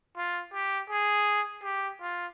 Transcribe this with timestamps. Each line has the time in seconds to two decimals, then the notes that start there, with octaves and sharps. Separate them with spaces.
0.17 F4
0.54 G4
0.90 G#4
1.64 G4
2.01 F4